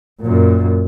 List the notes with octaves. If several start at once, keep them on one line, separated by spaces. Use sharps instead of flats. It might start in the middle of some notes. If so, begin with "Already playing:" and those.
F#2 A#2